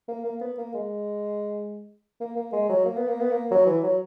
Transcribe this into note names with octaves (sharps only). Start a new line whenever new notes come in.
A#3
A#3
B3
A#3
G#3
A#3
A#3
G#3
F#3
A#3
B3
A#3
B3
A#3
F#3
E3
F#3